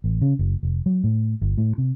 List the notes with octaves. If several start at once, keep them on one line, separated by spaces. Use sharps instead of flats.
A1
C#3
F#1
F1
F#3
A2
G1
A2
C3